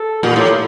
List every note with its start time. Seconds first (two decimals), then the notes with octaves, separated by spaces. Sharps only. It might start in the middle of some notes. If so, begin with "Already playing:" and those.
Already playing: A4
0.23 A#2 G4
0.36 A2